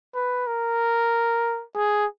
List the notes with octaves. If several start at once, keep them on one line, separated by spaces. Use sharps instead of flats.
B4
A#4
G#4